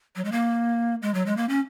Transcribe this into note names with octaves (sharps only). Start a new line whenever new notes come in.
F#3
G#3
A#3
G#3
F#3
G#3
A#3
C#4